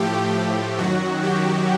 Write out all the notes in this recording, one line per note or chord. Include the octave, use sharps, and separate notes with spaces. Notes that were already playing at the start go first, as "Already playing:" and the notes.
Already playing: A2 F3 A3 G4
G4
F#2 D#3 F#3 F#4
G4